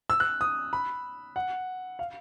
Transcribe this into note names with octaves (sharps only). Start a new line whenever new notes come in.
E6
F#6
D#6
B5
F#5
F5